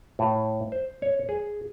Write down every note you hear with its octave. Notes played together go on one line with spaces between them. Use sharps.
A2
C5
C#5
G#4